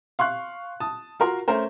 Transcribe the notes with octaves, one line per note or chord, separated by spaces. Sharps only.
F5 C6 C#6 F#6
A5 D#6
F4 F#4 A#4 C6
A3 C#4 A#4 C5